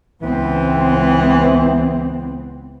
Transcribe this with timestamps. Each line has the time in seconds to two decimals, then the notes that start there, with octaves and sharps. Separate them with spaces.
0.22 C#2 E3 B3 C4